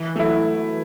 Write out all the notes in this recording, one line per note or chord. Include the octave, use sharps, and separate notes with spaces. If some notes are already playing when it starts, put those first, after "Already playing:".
Already playing: E3
F#3 A3 E4